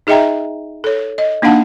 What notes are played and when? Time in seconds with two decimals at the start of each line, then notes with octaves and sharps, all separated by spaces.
0.07 D#4 G#4 D#5 E5 G5 A#5
0.84 A4 C#5
1.18 D#5
1.42 A#3 D4 D#4 F5 F#5 A5